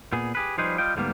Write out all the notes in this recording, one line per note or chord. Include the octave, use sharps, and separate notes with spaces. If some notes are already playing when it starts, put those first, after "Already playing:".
A#2 B3 G#4
G4 G#4 B4
F3 G3 D#4 G#4 B4 C5
G3 F4 D#5 G5
D2 G#2 D3 G3 A#3 B3